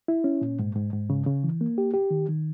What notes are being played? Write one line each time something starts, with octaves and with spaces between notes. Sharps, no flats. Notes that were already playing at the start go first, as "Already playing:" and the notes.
E4
C#4
A#2
G#2
G#2
G#2
C#3
C#3
E3
A#3
G4
G4
D#3
D#3